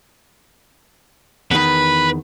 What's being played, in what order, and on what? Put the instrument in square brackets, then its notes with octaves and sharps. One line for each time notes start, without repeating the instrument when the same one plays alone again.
[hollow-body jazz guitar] E2 D#3 [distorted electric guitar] B4